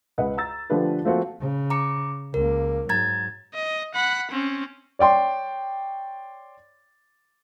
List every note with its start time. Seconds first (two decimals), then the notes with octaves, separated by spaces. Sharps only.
0.18 C#2 B4 D#5 F#5
0.37 A#5 E6 A6
0.70 D3 F3 A3 D4 G4 B4
1.05 F3 A3 A#3 C4 F4 F#4
1.40 C#3
1.70 A#5 D6 C#7
2.34 C#2 A#3 A#4
2.89 G#2 F#3 A#5 G#6 A6
3.55 D#5
3.94 F#5 B5
4.31 C4 C#4
4.99 C#5 D5 G5 C6